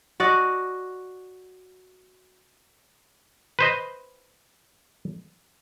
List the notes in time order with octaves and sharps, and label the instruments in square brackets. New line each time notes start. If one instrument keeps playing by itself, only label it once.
[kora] F#4 D5 D#5
[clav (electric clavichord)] B4 C5 D#5